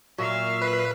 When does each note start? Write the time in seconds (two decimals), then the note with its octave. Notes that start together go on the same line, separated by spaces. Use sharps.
0.18 A#2 F#3 E5 F5
0.62 B4